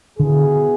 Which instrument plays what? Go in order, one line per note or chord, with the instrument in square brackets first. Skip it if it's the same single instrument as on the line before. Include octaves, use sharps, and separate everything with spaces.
[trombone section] B2 B3 E4 G#4 [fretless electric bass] D3